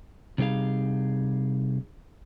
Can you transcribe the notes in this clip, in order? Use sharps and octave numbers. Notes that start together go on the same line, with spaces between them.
C3 G3 D#4 G#4 F5